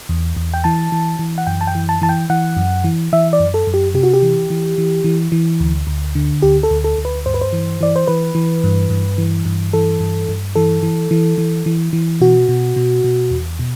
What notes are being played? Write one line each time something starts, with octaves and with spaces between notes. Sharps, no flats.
E2
E2
G5
E3 A5
E3
E3
F#5
F#2 G5
A5
G5
E3
A5
E3 A5
G5
E3 F#5
F#2
E3
E3 E5
D5
F#2
A4
F#2
G4
C3 G4
F#4
G4
E3
E3
E3
E3
E3
D2
D2
D3
D2 G4
A4
D2
A4
D2
B4
G2 C5
B4
C5
E3
E3 D5
C5
E3 B4
E3
G2
G2
E3
G2
E3 A4
G2
G2
E3 A4
E3
E3
E3
E3
E3
B2 F#4
B2
B2
B2
E2
B2